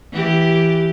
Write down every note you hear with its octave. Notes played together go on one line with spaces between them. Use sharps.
E3 G4